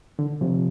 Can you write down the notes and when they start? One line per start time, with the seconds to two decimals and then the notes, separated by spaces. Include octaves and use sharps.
0.19 D3
0.41 C3 F3